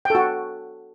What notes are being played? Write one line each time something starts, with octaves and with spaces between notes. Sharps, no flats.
F#4 A4 G5